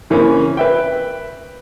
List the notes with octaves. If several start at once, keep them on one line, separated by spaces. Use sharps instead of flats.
C#3 E3 A#3 C4 C#4 E4
B4 E5 G5